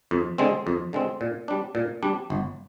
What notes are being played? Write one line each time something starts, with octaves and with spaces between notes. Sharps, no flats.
F2
D3 G#3 C4
F2
D3 G#3 C4
A#2
G3 D4
A#2
G3 D4
G1